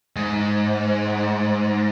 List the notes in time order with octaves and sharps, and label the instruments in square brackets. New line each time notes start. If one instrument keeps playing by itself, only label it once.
[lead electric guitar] G#2